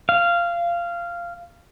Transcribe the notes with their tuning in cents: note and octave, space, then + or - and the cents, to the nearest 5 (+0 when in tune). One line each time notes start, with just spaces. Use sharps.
F5 -15